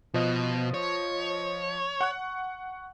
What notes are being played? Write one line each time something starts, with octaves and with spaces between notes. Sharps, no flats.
B2 F3 D#5
C#5
F#5 C#6 F#6